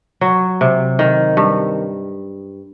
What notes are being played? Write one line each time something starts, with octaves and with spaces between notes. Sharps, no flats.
F#3
C3
D#3
G2